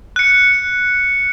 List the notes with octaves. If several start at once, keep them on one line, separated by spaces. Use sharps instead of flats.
F#6 C#7